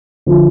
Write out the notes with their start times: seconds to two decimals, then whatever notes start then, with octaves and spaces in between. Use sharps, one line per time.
0.26 D3 F3